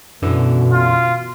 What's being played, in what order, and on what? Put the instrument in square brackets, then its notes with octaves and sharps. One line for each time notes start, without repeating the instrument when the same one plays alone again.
[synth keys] F#2 D3 E3 [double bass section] B2
[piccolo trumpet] F4